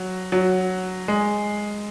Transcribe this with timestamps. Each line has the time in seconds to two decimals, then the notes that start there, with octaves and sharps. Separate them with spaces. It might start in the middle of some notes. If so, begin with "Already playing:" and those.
Already playing: F#3
0.32 F#3
1.08 G#3